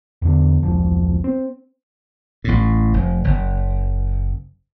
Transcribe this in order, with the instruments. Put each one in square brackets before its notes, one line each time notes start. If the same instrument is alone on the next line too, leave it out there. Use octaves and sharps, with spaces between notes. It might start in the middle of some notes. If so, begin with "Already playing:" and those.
[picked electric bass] E2 D3
E1 C2 F3
C4
[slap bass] A1 A2
F1
F#1